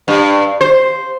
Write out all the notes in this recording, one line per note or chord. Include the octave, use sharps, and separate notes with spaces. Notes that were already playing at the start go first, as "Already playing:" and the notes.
G2
C5